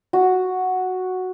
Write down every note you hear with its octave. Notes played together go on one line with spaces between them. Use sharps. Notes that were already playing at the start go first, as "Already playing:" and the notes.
F#4